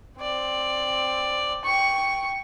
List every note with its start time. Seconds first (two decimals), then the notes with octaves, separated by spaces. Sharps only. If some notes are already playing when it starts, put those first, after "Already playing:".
0.19 C4 D5
1.65 G5 C#6